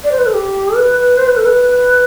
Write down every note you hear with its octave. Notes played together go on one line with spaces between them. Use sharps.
D5
C5
B4
A4
G4
B4
C5
B4
A4
B4